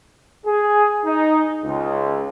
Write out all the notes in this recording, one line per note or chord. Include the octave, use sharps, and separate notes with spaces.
G#4
D#4
C#2